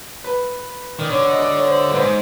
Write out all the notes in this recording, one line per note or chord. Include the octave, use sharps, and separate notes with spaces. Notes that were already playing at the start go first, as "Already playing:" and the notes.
B4
D#3 D5
D3 C#5
D#5
D5
C#5
C5
G2 B4
G#2 C5